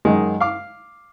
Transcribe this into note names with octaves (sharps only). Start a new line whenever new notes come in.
F#2 D#3 G#3
F5 D6